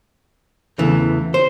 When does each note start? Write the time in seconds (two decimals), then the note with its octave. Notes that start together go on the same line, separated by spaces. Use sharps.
0.78 E2 C#3 E3 A3
1.34 C5